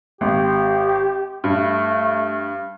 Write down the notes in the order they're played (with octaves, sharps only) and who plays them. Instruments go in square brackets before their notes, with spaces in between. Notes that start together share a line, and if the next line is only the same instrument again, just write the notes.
[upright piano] G#1 [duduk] G4
[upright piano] G2 [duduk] A3